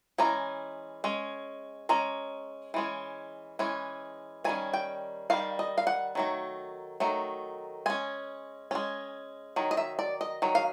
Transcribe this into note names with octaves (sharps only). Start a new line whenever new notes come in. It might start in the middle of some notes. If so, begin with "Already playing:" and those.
E3 G#3 C#4 A#5
G#3 C#4
G#3 C#4 A#5
E3 G#3 C#4
E3 G#3 C#4
D#3 G3 C#4 G#5
G5
D#3 G3 F5
D#5
F5
F#5
D#3 F#3 A3
D#3 F#3 A3
G#3 C#4 G#5
G#3 C#4
D#3 F#3
D#5
E5
D5
D#5
D#3 F#3
F5